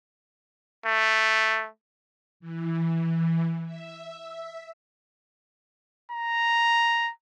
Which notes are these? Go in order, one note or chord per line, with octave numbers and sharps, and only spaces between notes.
A3
E3
E5
A#5